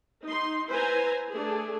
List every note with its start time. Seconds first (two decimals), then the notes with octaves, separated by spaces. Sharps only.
0.24 D#4 C6
0.69 E4 B4 C5 G#5 A#5
1.33 A3 D4 G#4 A4